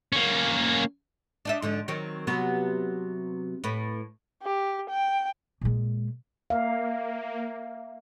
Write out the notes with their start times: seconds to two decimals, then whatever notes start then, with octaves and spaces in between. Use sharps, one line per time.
0.12 A#3 C#4
1.45 D4 D#4 E5
1.62 G#2 D3 F3
1.88 D#3 F#3 C4
2.27 C3 F#3 B3
3.64 A2 B4
4.43 G4
4.90 G5
5.61 A#2 G#3
6.50 A#3 E5 F5